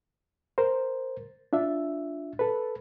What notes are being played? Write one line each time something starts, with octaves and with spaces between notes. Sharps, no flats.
A#4 C5
D4 F4 E5
A4 B4